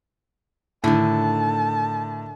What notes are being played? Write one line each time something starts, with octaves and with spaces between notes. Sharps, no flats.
A2 D3 D#3 A5